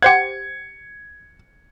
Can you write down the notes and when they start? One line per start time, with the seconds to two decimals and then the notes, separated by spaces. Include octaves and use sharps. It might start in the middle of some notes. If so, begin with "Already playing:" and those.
0.02 G4 C5 F#5 G#6 C#7